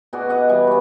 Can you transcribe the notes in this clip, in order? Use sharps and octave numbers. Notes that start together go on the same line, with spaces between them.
B2 F#4 G#4 D5
F#4 D#5 F#5
E3 G3
B3 C#5